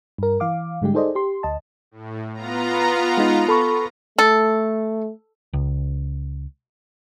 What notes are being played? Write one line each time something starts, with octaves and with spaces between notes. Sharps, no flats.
G2 A#4
E3 F5 D6
G#2 D3 G3 G#3 G4
D#4 G#4 A4 C5 D5 D#5
G4 C6
D2 D#5 A5
A2
B3 F4 A#5
G#3 D#4
A4 B5 C#6
A3 A4
C#2